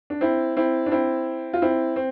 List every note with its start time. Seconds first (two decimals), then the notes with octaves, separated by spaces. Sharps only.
0.10 D4
0.21 C4 E4
0.57 C4 E4
0.86 D4
0.91 C4 E4
1.53 F4
1.62 C4 E4
1.96 C4